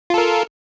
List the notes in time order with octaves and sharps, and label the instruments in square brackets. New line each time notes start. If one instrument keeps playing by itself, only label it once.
[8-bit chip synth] F4
A4
A#4